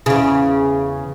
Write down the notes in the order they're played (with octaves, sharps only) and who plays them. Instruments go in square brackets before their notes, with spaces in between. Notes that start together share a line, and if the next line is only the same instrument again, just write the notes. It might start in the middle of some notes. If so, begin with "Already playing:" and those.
[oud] E2 C#3